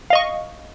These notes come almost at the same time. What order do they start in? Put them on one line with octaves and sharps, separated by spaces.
F5 D#5 C#6